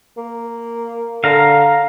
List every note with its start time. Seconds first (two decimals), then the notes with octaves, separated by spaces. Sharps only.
0.17 A#3
1.24 D3 F5 A#5